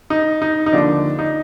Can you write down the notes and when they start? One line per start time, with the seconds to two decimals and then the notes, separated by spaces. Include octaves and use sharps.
0.10 D#4
0.42 D#4
0.66 D#4
0.72 D#2 D3 F3 D4
1.19 D#4